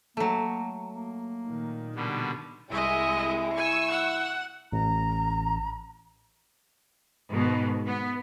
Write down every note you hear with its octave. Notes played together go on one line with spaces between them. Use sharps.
F#3 A3 A#3
A#3
A#2 D#3
B2 D3 G3
C2 G#3 E4 D#5 E5
G#5 C#6 E6
F#5
A1 A#5
G#2 B2 D#3
B3